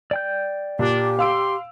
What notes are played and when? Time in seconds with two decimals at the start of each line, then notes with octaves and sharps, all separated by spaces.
0.11 D5 G5 G6
0.79 A#2 D4 G4
1.19 F5 C6 E6 D7